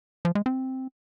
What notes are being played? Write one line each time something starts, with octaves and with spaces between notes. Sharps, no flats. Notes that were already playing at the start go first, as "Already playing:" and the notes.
F3
G#3
C4